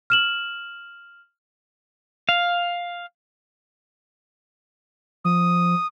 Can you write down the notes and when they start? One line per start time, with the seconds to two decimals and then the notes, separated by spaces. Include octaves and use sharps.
0.10 F6 E7 F#7
2.29 F5
5.25 F3 D#6